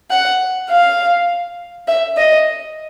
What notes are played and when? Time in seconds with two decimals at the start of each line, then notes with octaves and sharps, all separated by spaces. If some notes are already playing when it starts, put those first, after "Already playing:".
0.10 F#5
0.70 F5
1.88 E5
2.17 D#5